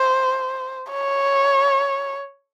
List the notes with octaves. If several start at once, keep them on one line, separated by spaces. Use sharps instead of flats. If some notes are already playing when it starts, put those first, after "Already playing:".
Already playing: C5
C#5